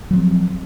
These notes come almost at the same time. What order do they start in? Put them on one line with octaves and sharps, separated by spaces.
F#3 F3 C4